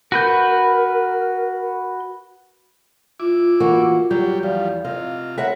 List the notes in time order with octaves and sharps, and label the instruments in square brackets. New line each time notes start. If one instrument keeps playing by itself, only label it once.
[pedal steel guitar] F#4 B4 G6 [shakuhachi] A#4
[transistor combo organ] E4 D6 [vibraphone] F4
[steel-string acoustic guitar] E3 A#3 F#4
[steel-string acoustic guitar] F#3 [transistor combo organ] G3 G4
[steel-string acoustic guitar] E2 [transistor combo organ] F3 G3 [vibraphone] F5
[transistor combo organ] C3 F4 [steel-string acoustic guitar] D#5
[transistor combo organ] F#4 A#4 B4 [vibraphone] C#5 [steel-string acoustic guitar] E5 F#5